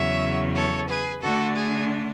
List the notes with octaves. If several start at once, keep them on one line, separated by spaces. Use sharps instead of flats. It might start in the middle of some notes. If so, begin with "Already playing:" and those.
Already playing: E2 C#3 F#3 C#5 E5
A4 C#5
G#4 B4
D3 A3 D4 F#4 A4
G#4